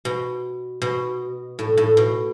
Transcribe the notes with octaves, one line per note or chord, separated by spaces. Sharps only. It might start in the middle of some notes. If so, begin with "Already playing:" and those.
B2
B2
A2
A2
B2